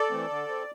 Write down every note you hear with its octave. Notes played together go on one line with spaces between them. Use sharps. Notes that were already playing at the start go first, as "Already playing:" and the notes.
Already playing: A4 D5
E3 A3 C4
D3
C4